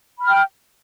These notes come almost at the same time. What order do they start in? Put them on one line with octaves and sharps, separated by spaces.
B5 F6 G5